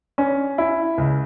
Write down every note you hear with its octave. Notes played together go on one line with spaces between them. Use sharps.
C#4
E4
C#2